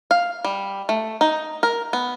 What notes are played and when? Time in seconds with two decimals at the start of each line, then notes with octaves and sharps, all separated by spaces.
0.11 F5
0.44 G3
0.89 A3
1.21 D#4
1.63 A#4
1.93 B3